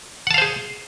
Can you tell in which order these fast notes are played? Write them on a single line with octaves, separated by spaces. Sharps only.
F#5 A5 F5 C5 G#4